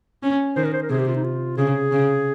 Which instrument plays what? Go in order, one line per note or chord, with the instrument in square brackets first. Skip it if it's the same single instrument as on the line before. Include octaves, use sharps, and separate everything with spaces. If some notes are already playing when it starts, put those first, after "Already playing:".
[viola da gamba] C#4
[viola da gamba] D#3 [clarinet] C5
[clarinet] A#4
C5
A#4
[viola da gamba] C3 [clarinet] G#4
[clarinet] G4
F4
D#4
F4
[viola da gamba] C#3 [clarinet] G#4
[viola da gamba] C#3